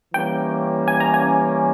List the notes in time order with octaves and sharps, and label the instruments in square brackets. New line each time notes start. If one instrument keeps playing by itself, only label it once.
[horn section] E3 G3 A#3 C#4 [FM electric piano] G5
[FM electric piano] G#5
A#5
G#5